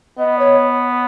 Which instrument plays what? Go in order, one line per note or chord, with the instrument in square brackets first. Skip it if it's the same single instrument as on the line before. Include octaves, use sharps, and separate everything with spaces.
[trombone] B3 [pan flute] D#5
[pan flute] C#5